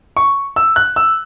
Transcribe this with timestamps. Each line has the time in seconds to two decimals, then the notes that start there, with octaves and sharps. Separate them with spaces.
0.17 C#6
0.56 E6
0.76 F#6
0.96 E6